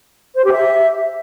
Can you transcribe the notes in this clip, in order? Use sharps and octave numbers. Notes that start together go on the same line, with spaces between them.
C5
G4
E5